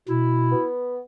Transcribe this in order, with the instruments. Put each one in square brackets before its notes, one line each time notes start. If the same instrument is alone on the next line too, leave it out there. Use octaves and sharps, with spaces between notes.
[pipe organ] B2 [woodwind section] E4
[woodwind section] B3